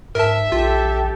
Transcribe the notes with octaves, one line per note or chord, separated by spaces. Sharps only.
G#2 A#4 E5 A5
A#1 F4 G4 A4